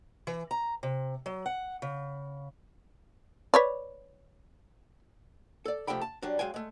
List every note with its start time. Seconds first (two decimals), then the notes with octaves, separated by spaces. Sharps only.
0.27 E3
0.51 A#5
0.83 C3
1.26 F#3
1.46 F#5
1.82 C#3
3.54 B4 C#5 D5
5.65 A4 D5
5.87 C3 F3 A3 G4 G5 B5
6.01 A5
6.22 F#3 G3 D4
6.39 F#3 G#3 F5 G5 G#5
6.54 G#3 A3